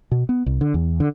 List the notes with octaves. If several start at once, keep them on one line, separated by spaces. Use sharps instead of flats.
B2
B3
C2
D3
E2
D3